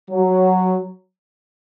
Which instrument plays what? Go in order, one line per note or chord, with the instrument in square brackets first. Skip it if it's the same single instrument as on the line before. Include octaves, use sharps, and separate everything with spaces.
[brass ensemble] F#3